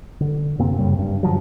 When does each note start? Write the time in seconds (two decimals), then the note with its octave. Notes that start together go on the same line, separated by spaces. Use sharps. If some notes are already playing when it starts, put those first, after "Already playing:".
0.20 D3
0.58 F#2 C3 A#3 C4
0.78 F#2 A2 C#3 G3
0.99 G2
1.23 G2 D3 F3 F#3